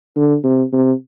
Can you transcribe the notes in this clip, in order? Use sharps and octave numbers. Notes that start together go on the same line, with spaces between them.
D3
C3
C3